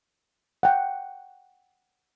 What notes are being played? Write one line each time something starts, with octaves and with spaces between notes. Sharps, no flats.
F#5 G5